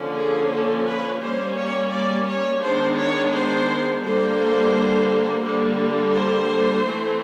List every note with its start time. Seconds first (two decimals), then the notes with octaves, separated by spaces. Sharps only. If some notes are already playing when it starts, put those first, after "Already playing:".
Already playing: D3 F3 A#3 C#4
0.16 G#4
0.51 A4
0.86 B4
1.21 G3 A#3 C#4 C5
1.56 C#5
1.92 D5
2.27 C#5
2.62 D#3 G#3 B3 D4 C5
2.97 C#5
3.33 C5
4.02 D3 G3 A#3 C5
5.43 D3 G3 A#3
6.13 C5
6.84 E3 A3 C4